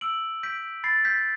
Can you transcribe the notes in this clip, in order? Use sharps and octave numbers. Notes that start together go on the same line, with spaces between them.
E6 D7 F#7
G6 B6 D7
B5 A6 C7
G6 B6